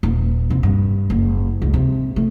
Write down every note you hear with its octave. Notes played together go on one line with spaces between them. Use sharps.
D#1
C3
G2
F#1
C#2
C3
A3